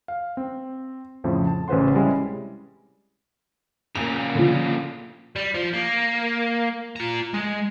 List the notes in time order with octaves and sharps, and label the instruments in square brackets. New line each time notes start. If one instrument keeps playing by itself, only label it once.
[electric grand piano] F5
C4
F2 A2 C#3 F3
A5
A1 C#3 B4 C5 F#5 C6
C3 G3 G#3 C#4 E4
[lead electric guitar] A#2 C#3 [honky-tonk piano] A#3 F7
[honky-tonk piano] D3 F3
[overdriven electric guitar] G3
F3
A#3
F4 A#5
G#3